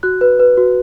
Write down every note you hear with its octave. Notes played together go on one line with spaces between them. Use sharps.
F#4 F#6
B4
B4
F#4